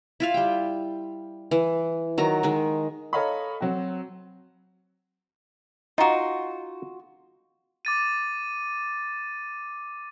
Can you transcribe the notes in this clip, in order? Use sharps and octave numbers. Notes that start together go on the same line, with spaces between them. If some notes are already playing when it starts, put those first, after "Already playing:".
E4 F4 F5
G3 G5
E3
D#3 F#3 A#5
D#3 G#3
A4 C#5 D#5 F5 A#5 B5
F#3 C4 F#4
D#4 F4 F#4
D6 A6 D#7